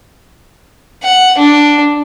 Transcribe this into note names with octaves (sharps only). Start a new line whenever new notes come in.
F#5
D4